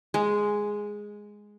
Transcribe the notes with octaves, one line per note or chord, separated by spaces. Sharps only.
G#3